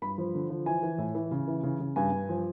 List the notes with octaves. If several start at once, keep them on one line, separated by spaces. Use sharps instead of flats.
G2 B5
F3
D3
F3
E3 G#5
E3
A2
E3
C#3
E3
C#3
C#3
G2 G#5
G2
F3